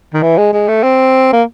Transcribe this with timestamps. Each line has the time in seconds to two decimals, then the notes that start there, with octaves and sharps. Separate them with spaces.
0.14 D#3
0.22 E3
0.37 G#3
0.53 G#3
0.68 A3
0.83 C4
1.32 A#3